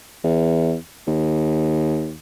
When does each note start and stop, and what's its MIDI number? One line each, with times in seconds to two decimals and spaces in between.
0.24 0.75 40
1.07 2.17 39